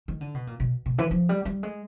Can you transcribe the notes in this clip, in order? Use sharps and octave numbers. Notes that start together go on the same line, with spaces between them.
D#3
D3
B2
A#2
B2
B2
E3
F3
G3
G3
G#3